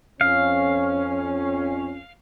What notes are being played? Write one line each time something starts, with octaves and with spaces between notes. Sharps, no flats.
F2 C#4 F5